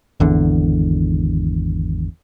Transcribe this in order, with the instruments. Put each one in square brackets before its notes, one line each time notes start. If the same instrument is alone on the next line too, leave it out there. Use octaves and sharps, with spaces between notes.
[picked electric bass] G#1 E2 D3